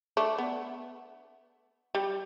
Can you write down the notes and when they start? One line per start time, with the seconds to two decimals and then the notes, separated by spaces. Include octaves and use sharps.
0.17 A3 D4
0.38 B3
1.95 G3